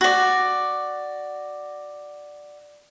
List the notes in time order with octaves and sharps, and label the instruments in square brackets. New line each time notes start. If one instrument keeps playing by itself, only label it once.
[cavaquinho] F#4 D5